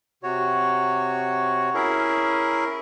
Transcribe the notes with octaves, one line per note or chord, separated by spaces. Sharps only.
C3 F#4 C#5
C#4 E4 G#4 A#4